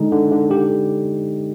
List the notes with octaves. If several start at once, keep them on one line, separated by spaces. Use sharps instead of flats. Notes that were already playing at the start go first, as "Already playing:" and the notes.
Already playing: D3 G#3 D#4
D3
D3
D3 G4